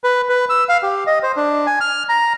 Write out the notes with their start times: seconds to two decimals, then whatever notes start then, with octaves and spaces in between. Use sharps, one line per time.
0.04 B4
0.29 B4
0.49 E6
0.69 F5
0.83 G4
1.07 D#5
1.23 C5
1.36 D4
1.66 G#5
1.81 F6
2.09 A#5